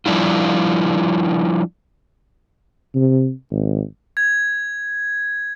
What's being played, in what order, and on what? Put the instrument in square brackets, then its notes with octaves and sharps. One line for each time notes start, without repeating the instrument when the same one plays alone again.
[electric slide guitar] F3 G3 D4 E4 F4
[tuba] C3
G#1
[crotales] G#6